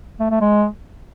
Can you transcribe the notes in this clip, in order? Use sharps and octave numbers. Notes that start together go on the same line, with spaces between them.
A3
A3
G#3